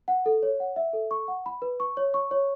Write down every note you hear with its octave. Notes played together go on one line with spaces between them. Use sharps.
F#5
A4
C#5
F#5
E5
A4
C#6
F#5
B5
B4
C#6
C#5
C#6
C#5